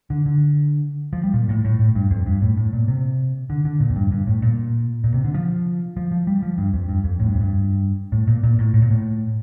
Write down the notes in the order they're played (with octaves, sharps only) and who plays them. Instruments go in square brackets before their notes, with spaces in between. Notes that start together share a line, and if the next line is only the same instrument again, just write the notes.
[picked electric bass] D3
D3
F3
G3
A#2
A2
A2
A2
G2
F2
G2
A2
A2
A#2
C3
D3
D3
A#2
F2
G2
G2
A2
A#2
A#2
C3
D3
F3
F3
F3
G3
F3
G2
F2
G2
F2
A2
G2
F2
G2
A2
A#2
A#2
A2
A2
A#2
A2